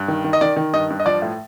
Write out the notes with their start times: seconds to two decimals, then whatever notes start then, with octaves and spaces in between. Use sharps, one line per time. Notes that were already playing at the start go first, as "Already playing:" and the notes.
Already playing: G2
0.08 D#3
0.24 D#3
0.33 D#5
0.41 D#3 D5
0.56 D#3
0.73 G2 D#5
0.90 G2
1.00 D#5
1.06 F3 D5
1.22 A2